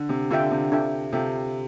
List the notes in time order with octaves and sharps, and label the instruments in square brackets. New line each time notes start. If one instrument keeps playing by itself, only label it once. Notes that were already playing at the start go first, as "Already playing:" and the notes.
Already playing: [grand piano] D3
C3
[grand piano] D3 [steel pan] D4 F4 A4 E5 G5
[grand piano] C3
[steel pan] D4 F4 A4 E5 G5
[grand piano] C3 [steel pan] D4 F4 A4 E5 G5